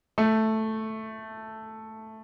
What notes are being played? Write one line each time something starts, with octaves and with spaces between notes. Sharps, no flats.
A3